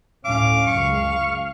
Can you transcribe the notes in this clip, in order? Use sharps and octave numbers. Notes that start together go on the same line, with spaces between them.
D2 A2 C#4 F5 D6
C#2 F#2 C#6